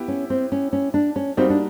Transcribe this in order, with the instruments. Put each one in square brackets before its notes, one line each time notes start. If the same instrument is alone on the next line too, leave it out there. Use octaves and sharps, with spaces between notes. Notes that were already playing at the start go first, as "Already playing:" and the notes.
Already playing: [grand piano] B3 E4 G4
[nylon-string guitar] C#4
C4
C#4
C#4
D4
C#4
[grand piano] G3 A#3 D#4 F#4 [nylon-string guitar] C4
[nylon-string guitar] D4